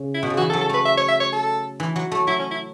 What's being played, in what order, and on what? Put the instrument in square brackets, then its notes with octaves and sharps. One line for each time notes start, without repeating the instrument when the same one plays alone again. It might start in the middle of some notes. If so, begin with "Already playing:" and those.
Already playing: [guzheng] C#3
[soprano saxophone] E4
[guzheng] B2
C#3
[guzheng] E3 [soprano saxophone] F#4
[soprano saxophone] A4
[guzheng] F#3
[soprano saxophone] A4
[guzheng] A3 [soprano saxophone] B4
[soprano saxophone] E5
C#5
E5
C#5
A4
[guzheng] E3
F#3
A3
[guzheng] F#3 [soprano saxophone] E4
[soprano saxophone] C#4
E4